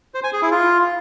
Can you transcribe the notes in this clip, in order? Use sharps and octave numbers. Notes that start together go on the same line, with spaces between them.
C5
G#5
G#4
E4
F4